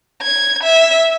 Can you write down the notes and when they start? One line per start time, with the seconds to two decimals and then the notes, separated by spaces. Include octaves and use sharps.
0.22 G#6
0.63 E5